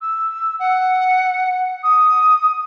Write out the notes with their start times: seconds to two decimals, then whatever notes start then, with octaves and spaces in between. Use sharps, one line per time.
0.02 E6
0.59 F#5
1.83 D#6